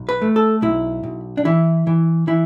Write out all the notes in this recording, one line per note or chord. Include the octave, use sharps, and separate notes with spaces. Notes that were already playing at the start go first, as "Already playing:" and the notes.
Already playing: B1
B4
A3
A4
B1 E4
B1
D4
E3 E4
E3
E3 E4